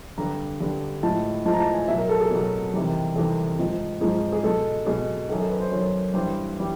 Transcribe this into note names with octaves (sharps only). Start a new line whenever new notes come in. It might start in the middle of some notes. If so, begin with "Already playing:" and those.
G2 D3 G3 A#5
G2 D3 G3
A2 F3 G#3 A5
A2 F3 G#3 A5
A#5
A5
G#5
B2 F#3 E5
A#4
A4
G#4
B2 F#3
E2 C3 D#3 G3
E2 C3 D#3 G3 A4
G#2 F3 G#3
G#2 F3 G#3 G#4
G#4
B2 G#3 A4
B2 G#3 G#4
F#2 D#3 F#3 A4
A4
B4
C5
F#2 D#3 F#3 C#5
G2 E3 G3 C5
E3 G3